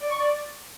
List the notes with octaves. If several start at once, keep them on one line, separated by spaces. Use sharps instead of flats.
D5
C#6
D5